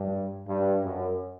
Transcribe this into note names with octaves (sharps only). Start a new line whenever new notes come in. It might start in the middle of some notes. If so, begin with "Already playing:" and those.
Already playing: G2
G2
F#2